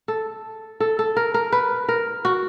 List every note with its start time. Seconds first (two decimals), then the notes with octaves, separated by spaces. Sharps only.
0.08 A4
0.80 A4
0.99 A4
1.17 A#4
1.34 A#4
1.52 B4
1.89 A#4
2.25 F#4